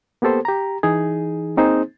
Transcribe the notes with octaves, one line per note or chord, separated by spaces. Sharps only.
A#3 B3 G4 A4 C5
G4 A#5
E3 D#4 G#4
A#3 C4 D#4 G#4 C5